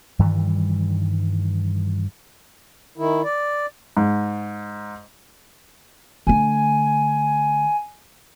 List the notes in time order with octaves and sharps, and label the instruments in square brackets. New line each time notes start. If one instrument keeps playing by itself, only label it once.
[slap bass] G2 D#3 E3 G3
[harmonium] D#3 E4
D5
[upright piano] G#2
[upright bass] D3 A3 [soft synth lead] G#5